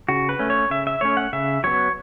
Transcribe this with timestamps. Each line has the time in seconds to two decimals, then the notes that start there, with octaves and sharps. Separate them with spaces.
0.09 C#3 F#4
0.29 B4
0.39 A3 C#4
0.50 C#5
0.70 C#3 E5
0.87 E5
1.01 A3 C#4 C#5
1.17 F#5
1.33 C#3 E5
1.64 F#3 B3 C#5